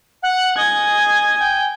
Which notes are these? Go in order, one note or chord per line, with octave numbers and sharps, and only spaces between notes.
F#5
D#5 G#5 G#6
G5